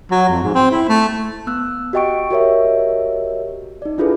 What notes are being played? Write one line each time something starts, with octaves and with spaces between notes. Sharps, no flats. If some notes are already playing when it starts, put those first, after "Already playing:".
F#3
F2
G#2
C4
E4
A3
B3 E6 F#6
F#4 G4 D#5 G5 C#6 D7
F#4 G4 A#4 C#5 D#5 E5
D#4 D5
D4 E4 F4 G#4 A4 B4